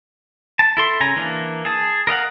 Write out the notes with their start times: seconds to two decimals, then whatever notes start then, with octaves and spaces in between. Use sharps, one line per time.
0.59 A5
0.77 E4 A4 C6
1.00 C#3 G#5 A#5
1.16 E3 A#3 D4
1.65 G#4 A5
2.07 A#4 D#5 F5 F#5